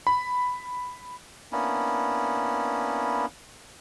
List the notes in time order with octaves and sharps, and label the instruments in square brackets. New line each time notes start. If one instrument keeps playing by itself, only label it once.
[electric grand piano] B5
[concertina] A#3 B3 C#4 D4 E4